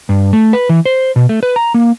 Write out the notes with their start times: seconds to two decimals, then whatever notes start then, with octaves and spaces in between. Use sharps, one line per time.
0.09 G2
0.33 A3
0.53 B4
0.69 E3
0.86 C5
1.16 B2
1.29 A3
1.43 B4
1.56 A#5
1.74 A#3